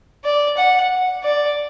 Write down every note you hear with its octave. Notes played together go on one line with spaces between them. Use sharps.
D5
F#5
D5